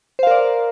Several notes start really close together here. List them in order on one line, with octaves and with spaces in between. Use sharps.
C5 F5 A#4 D5